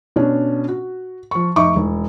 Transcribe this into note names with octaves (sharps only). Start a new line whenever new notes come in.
B2 C#4 D4
F#4
F3 C#6
F1 D#4 E5 C#6 D6
E1